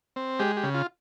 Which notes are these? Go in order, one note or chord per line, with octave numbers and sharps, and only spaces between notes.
C4
G#3 G4
G4
C#3
F4